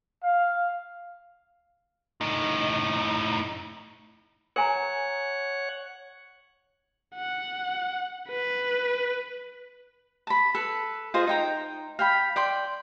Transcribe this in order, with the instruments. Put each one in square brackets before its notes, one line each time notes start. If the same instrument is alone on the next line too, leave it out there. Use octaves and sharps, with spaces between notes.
[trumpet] F5
[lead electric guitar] A2 D#4
[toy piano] A#4 G#5 A#5 [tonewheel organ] C#5 F#5
[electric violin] F#5
B4
[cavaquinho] A5 B5
A4 B4
F4 G#4 C5 D#5
D#4 G5 A#5
F5 G5 B5
D5 G5 C6